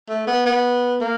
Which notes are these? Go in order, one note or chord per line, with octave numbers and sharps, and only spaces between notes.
A3
B3
B3
A#3